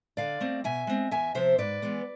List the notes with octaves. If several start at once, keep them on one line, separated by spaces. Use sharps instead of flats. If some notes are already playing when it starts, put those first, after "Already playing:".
D3 D5 F5
A3 C4
B2 E5 G#5
G#3 C4
E2 E5 G#5
C3 F3 C5 E5
G#2 B4 D5
E3 G#3 B3